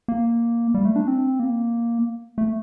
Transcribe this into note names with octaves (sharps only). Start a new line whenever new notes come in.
A#3
G3
A3
D4
C4
A#3
A3